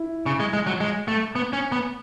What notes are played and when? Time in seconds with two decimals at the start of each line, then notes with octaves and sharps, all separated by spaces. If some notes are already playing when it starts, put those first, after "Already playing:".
Already playing: E4
0.26 C#3
0.40 G#3
0.53 G#3
0.67 F#3
0.81 G#3
1.08 A3
1.35 B3
1.53 C#4
1.72 B3